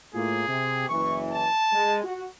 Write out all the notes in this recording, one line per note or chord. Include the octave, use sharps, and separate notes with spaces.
A2 A#3 F4 G#4
C3
F#1 E3 C#6
A5
G#3
F#4